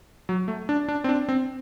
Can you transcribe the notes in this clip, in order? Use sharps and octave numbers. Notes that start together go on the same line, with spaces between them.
F#3
A3
D4
D4
C4
D4
C4